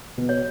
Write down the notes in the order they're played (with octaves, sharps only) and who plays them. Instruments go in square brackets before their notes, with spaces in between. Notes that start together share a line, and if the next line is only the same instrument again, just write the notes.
[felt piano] B2
[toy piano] C#5